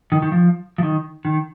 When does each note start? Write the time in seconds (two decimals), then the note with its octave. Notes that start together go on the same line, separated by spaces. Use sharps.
0.12 D#3
0.22 D#3
0.32 F3
0.78 F3
0.83 D#3
1.25 D#3